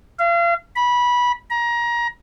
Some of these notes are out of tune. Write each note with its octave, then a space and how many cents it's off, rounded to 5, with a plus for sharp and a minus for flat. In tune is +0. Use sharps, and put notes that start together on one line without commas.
F5 -35
B5 -20
A#5 +25